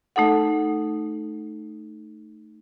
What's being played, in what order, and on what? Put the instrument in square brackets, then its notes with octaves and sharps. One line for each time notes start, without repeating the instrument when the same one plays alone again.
[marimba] A3 D#4 A4 F#5